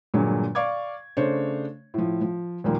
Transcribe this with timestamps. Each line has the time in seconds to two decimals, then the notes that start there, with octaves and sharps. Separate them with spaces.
0.14 G2 A#2 D3 F#3 G#3
0.55 D5 F5 C#6 D6 G#6
1.17 C#3 A3 D4 C5 C#5
1.94 A2 F3
2.21 F3
2.64 D#2 A#2 F3 G3 A#3